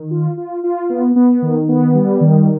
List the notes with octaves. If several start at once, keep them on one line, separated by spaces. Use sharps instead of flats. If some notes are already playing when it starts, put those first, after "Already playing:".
Already playing: D#3
F4
F4
F4
B3
B3
D#3
B3
G3
D#3